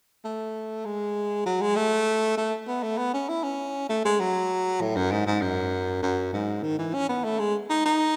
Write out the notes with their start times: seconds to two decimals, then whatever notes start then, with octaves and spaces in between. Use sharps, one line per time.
0.24 A3
0.85 G#3
1.46 F#3
1.61 G#3
1.76 A3
2.37 A3
2.67 B3
2.83 A3
2.98 B3
3.14 C#4
3.28 E4
3.43 C#4
3.89 A3
4.05 G#3
4.20 F#3
4.81 A2
4.96 F#2
5.12 G#2
5.27 G#2
5.42 F#2
6.02 F#2
6.33 G#2
6.63 D#3
6.79 E3
6.94 C#4
7.09 B3
7.24 A3
7.39 G#3
7.69 D#4
7.85 D#4